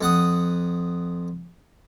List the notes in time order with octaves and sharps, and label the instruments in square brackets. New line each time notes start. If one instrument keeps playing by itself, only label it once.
[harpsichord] F2 F#5 D#6